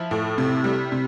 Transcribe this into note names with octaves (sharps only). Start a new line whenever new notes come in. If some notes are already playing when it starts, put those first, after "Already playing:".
Already playing: F3 E4
A2
C3
G3
C3